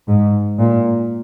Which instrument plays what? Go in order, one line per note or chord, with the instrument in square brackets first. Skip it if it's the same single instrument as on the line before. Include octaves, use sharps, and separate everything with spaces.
[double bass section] G#2
A#2